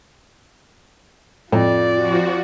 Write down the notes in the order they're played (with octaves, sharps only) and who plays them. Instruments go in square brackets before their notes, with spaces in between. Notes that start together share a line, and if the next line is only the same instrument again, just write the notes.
[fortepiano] F2 [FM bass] A2 [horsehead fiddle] F4 D5
[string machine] F3 F#4